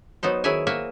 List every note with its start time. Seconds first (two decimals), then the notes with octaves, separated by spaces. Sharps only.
0.23 F#3 B3 D#4 C5
0.44 D#3 F#3 E4 G#4 E5 G#5
0.67 A#3 F#4 E5 G#5